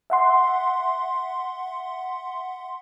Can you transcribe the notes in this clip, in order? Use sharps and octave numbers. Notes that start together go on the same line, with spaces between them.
E5 F#5 C6